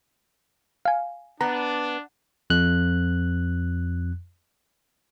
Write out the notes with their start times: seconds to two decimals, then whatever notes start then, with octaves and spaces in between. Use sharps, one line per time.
0.85 F5 G#5
1.41 B3 D4 A#5
2.50 F2 F#6